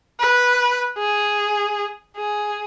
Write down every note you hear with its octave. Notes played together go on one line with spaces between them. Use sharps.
B4
G#4
G#4